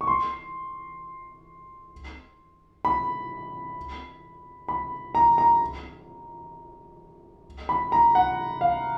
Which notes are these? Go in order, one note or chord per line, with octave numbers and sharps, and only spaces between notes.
C#6
C6
B5
B5
A#5
A#5
B5
A#5
F#5
F5